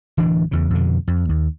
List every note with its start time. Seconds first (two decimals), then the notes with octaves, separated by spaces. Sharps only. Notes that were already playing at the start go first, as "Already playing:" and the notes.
0.17 D1 E3 D4
0.51 E2 C#3
0.70 F2 B2 D3
1.08 F2
1.29 D#2